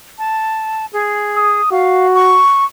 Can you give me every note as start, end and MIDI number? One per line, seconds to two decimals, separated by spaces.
0.19 0.86 81
0.93 1.61 68
1.37 1.70 87
1.72 2.43 66
1.72 2.07 77
2.15 2.65 85